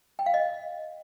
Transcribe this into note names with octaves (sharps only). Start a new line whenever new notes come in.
G5
F5
D#5